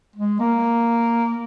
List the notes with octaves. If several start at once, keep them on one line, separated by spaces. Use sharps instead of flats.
G#3
A#3